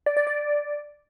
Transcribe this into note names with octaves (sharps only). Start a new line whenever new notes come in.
D5
D5
D5